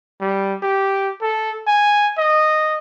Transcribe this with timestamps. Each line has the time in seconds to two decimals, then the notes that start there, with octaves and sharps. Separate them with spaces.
0.21 G3
0.63 G4
1.22 A4
1.67 G#5
2.18 D#5